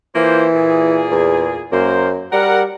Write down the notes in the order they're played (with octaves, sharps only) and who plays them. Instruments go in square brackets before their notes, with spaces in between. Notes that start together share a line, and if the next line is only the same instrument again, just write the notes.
[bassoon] E3 [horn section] A#3 F4 C5
[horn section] A#2 G#4
[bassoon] E2
[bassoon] F#2 [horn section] A#3 C5
[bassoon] G3 [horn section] A#4 F#5